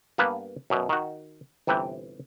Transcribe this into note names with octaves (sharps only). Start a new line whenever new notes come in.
G2 A#3 B3 B4 F5
F#2 B2
D#3 F#4
G1 C3 E3 B4 G5